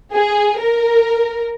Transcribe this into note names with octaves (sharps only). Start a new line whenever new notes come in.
G#4
A#4